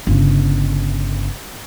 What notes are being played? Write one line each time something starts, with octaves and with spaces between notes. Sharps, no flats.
G1 C#3